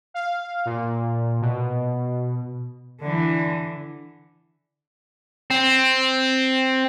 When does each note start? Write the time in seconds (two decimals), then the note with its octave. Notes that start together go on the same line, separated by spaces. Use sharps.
0.14 F5
0.65 A#2
1.41 B2
3.01 D3 E3
5.51 C4